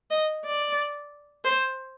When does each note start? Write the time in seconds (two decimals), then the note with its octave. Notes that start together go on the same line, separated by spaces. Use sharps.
0.11 D#5
0.45 D5
1.44 C5